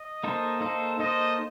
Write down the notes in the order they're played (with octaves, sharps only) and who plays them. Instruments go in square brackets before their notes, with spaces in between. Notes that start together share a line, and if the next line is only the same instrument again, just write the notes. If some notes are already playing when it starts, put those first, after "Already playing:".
Already playing: [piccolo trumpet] D#5
[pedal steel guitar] A#3 D#4 A4 C5
A#3 D#4 A4 C5
[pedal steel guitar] A#3 D#4 A4 C5 [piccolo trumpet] D#5